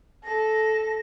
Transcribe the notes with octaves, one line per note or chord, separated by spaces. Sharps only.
A4 A#6